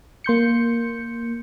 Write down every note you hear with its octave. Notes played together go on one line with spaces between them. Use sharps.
A#3 C6 G6 C#7